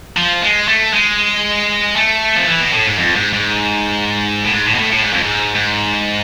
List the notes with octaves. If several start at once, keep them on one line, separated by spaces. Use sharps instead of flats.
F3
G#3
A3
G#3
A3
F3
E3
B2
A2
G#2
F2
G#2
G#2
A2
G#2
A2
B2
A2
A2
G#2
F2
G#2
G#2